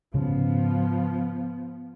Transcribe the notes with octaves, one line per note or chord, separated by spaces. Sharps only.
G#2 C#3 F3 B3 C#4